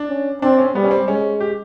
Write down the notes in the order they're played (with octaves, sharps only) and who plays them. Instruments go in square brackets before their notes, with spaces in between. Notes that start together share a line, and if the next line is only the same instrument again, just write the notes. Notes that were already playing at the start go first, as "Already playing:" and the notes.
Already playing: [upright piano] D4
[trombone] C#4
[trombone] C4 [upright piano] D4
[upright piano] C#4
[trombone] G3 [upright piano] B3
[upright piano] C#4
C4
[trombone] G#3 [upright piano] C#4
[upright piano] G4